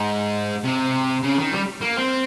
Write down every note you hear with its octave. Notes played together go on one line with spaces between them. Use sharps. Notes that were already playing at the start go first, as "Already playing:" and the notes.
Already playing: G#2
C3
C#3
D#3
G3
A#3
C4